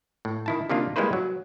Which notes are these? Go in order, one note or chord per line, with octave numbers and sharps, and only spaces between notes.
A2
D#3 E4 A5
C3 D#3 A#3 D4 F4
G3 G#3 A#3 E4 B4 C5
F#3